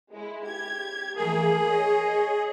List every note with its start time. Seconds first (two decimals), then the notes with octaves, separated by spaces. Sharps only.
0.12 G#3 E4
0.45 G4 G#6
1.16 E3 A3 A#3 G#4
1.67 C#5 D#5